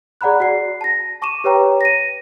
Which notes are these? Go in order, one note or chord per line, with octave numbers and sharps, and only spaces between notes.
G#4 D5 F#5 A#5 B5 F#6
F#4 D5 C7
A5 A#6
A5 C#6 D6 D#7 E7
G4 B4 C#5 G5 A#5
A#6 D#7